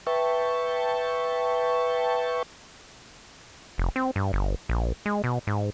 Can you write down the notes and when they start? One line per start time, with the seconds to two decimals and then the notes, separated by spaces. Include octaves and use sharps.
0.07 B4 E5 G5 A5 C#6
3.78 F1
3.96 C4
4.16 G2
4.33 G1
4.69 A#1
5.06 G#3
5.24 B2
5.47 G#2